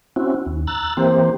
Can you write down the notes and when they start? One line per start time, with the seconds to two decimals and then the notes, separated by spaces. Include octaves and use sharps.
0.16 C4 C#4 E4 F#4
0.46 D#2
0.67 A#5 E6 F#6 A6
0.97 E3 A#3 C4 G4 C5